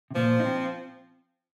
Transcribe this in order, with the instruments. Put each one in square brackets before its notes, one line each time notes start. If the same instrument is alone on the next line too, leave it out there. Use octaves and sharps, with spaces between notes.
[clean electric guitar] C3
[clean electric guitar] A#2 [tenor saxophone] F3
[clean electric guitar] D#4
C4